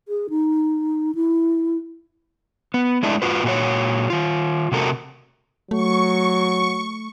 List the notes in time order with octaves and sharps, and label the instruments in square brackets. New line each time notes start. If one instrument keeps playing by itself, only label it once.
[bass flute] G#4
D#4
E4
[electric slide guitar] B3
G#3 A3 D4 E4
F4 F#4 B4
A#2 F#4 C#5
D#3 F4
C3 A3 F#4 A4 A#4
[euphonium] F#3 [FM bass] A3 [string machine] C#6